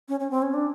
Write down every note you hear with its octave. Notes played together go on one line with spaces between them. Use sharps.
C#4
C#4
C4
C#4
D4